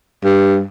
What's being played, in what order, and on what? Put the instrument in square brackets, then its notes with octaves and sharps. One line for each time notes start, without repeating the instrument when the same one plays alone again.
[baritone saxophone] G2